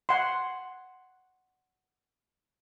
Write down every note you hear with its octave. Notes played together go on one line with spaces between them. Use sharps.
F#5 C6